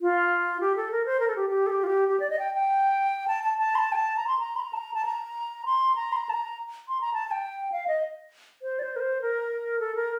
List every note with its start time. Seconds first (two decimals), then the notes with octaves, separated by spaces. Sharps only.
0.02 F4
0.61 G4
0.76 A4
0.91 A#4
1.06 C5
1.20 A#4
1.28 A4
1.36 G4
1.50 G4
1.67 A4
1.70 G4
1.84 F4
1.87 G4
2.09 G4
2.20 D5
2.30 D#5
2.39 G5
2.54 G5
3.28 A5
3.43 A5
3.58 A5
3.75 C6
3.79 A5
3.92 G5
3.96 A5
4.17 A#5
4.27 C6
4.39 A#5
4.56 C6
4.60 A#5
4.73 A5
4.77 A#5
4.94 A5
5.05 A#5
5.66 C6
5.95 A#5
6.12 C6
6.16 A#5
6.29 A5
6.33 A#5
6.88 C6
7.01 A#5
7.14 A5
7.28 A5
7.31 G5
7.72 F5
7.88 D#5
8.62 C5
8.79 D5
8.83 C5
8.96 A#4
9.00 C5
9.22 A#4
9.80 A4
9.96 A#4